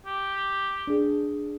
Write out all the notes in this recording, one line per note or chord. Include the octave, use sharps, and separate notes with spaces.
G4
D4 G#4